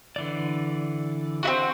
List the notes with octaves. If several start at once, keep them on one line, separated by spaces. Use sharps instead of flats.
D3 E3 D5
C4 E4 F#4